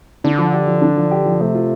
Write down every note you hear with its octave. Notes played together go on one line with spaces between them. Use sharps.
D3 D4
F3
G4
F3
D4
F3
G4
F3
C3 A3
F4